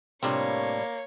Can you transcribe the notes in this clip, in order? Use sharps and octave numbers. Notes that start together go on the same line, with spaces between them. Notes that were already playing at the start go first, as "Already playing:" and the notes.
A2 C3 G3 A#3 C4 D4 F4 C#5